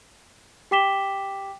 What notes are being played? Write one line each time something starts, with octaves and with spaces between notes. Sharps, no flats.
G4 G5 D6 B6 E7 G7